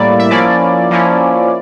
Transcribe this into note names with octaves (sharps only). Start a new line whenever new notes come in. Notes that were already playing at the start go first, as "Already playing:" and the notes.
Already playing: A2 G3 A#3 E4 D5
E5
F3 A#3 C#4 E4 D5
F3 A#3 C#4 E4